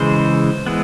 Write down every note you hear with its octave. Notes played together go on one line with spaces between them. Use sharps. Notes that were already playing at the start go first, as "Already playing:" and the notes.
Already playing: C#3 E3 G#3 C5
E3 G#3 B3